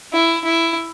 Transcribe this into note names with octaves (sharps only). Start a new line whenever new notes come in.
E4
E4